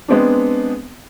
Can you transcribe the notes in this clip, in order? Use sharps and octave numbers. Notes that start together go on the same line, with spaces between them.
G#3 B3 C4 D4